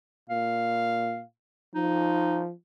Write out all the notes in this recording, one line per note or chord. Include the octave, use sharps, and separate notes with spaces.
A#2 F5
F3 D#4